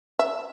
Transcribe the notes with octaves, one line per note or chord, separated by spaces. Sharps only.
E5